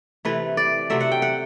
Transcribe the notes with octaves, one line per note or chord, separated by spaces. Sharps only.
C3 E3 A3 B4
D5
C3 F#3 A3 E5
F#5
G5
F#5